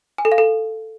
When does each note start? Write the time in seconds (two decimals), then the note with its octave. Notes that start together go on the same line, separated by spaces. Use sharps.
0.18 G#5
0.25 A4
0.32 F5
0.38 A4